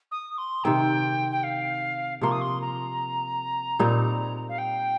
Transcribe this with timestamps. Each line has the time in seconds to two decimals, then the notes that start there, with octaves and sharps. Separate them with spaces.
0.11 D#6
0.38 C6
0.64 C3 D#3 C4 G5
1.32 G5
1.43 F5
2.21 C3 F3 A#3 C6
2.31 D#6
2.41 C6
2.61 A#5
3.79 A#2 G3 C4 D#4
4.49 F5
4.58 G5